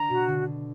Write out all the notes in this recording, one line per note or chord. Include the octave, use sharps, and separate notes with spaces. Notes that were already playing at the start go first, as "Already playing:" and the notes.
Already playing: D3 A#5
B2 F#4
D3